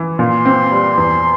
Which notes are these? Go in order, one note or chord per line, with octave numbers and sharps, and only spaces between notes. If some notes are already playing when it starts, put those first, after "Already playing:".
Already playing: E3
A#2 C6
C4
G3
E2